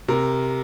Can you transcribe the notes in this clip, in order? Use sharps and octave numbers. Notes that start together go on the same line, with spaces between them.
C3 A#4